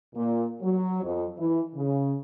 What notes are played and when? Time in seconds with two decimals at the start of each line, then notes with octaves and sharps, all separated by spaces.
0.15 A#2
0.61 F#3
1.03 F2
1.38 E3
1.75 C#3